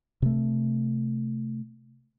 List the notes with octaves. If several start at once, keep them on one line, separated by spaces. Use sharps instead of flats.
C3 A3